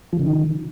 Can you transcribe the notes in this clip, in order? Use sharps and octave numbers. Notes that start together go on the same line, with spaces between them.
F3
C#3
D#3